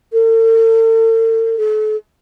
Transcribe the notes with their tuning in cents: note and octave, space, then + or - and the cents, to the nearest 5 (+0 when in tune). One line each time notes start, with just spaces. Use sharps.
A4 +45
A4 -40